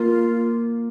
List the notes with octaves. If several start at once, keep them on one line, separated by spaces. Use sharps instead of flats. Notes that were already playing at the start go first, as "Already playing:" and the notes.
Already playing: A#3 F4